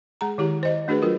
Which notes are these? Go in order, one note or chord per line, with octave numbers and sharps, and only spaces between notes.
G#3 G#4 A#5
D#3 E4 G4
C5 D#5
A3 D4 F#4 G#4 B4
F#3 F4 A#4